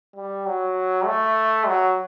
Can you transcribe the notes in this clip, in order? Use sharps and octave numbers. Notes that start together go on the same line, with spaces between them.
G3
F#3
A3
F#3